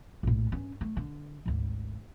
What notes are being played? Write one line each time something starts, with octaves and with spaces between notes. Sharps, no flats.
A#1 A2
G2 C#4
A3
D3
G#1 D2